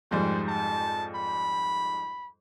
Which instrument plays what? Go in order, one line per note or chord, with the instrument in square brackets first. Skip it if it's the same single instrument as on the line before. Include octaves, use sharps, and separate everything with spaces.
[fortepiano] F2 G#2 G3 [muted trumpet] C5
[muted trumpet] A5
B5